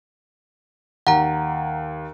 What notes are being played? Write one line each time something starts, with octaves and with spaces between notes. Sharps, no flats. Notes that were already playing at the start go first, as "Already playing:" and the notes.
D#2 F#5 A#5